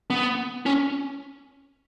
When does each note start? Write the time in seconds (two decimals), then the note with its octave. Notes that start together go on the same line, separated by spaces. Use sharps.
0.10 B3
0.66 C#4